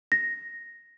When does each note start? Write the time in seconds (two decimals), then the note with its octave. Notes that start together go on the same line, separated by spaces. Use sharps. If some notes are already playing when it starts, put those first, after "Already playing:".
0.12 A#6